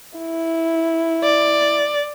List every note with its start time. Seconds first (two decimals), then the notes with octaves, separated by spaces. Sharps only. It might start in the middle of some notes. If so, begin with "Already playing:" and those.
0.19 E4
1.24 D5